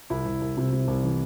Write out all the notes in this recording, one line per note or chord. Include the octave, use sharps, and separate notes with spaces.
C2 E4
C2
C2
C3
C3
C2
E3